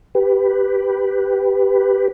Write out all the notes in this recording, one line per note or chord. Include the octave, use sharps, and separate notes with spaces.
G4 B4